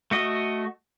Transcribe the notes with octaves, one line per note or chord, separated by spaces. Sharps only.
A3 F#4 D#5